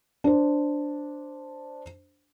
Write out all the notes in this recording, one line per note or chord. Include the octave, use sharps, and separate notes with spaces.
D4 C5